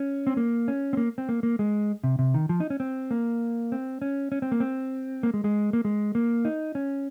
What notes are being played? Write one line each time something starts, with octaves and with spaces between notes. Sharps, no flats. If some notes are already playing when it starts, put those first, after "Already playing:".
Already playing: C#4
C4
A#3
C#4
C4
A#3
C4
A#3
A#3
G#3
C3
C3
D#3
F3
D#4
C#4
C4
A#3
C4
C#4
C#4
C4
A#3
C4
A#3
G#3
G#3
A#3
G#3
A#3
D#4
C#4